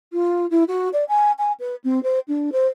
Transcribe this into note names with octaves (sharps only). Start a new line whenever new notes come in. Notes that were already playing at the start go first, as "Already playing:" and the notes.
F4
E4
F#4
D5
G#5
G#5
B4
C4
C5
D4
C5